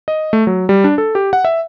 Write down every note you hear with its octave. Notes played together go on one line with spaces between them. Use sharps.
D#5
A3
F#3
G3
D4
A4
G4
F#5
E5